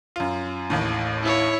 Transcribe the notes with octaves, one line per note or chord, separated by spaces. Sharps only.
F#2 F4
A1 D#2 A2
E4 C#5